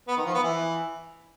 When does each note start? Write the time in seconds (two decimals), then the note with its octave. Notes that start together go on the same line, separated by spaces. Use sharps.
0.08 B3
0.17 D#3
0.26 F3
0.34 B3
0.43 E3